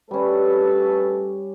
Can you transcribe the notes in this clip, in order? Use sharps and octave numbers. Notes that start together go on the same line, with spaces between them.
G3 A3 C#4 A4 B4